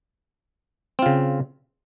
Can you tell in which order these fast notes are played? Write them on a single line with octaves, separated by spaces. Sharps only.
C4 F4 C#3